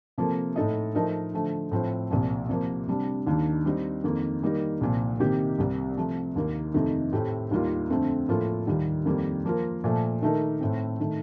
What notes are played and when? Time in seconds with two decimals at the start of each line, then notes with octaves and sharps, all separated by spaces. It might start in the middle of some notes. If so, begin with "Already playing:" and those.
0.18 C3 F3 A#3 F4 A4
0.56 A2 A3 D#4 A4 D#5
0.95 F3 A3 D#4 A#4 D#5
1.33 D3 F3 A3
1.71 A2 F3 C4 F4 C5
2.10 C2 A#2 F3
2.49 C3 F3 A#3
2.87 C3 G3 D4
3.27 D#2 D#3 A#3 D4
3.65 G3 C4 D#4
4.04 F2 D#3 A#3
4.43 D#3 G3 A#3 D#4 A#4
4.81 C2 A#2 F3
5.20 C3 D#3 A#3 D#4 G4
5.58 C2 C3 G3
5.97 C3 F3 A3
6.35 D#2 D#3 A#3
6.74 F2 C3 D#3 A3 D#4
7.13 A2 A3 C4 G4
7.51 D#2 D#3 G3 A#3 F4
7.90 F2 D3 A3 C4
8.29 A2 F3 A#3 F4 A4
8.67 D#2 D#3 G3
9.06 F2 D#3 G3 A#3
9.45 F3 A#3 F4 A#4
9.84 A#2 F3 A3
10.22 D#3 A3 D#4 A#4
10.60 A2 A3 C4
11.00 D#3 A3